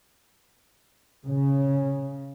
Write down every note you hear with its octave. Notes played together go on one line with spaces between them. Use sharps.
C#3